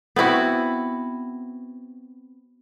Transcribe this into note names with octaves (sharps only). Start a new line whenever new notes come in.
B3 C4 E4 F#4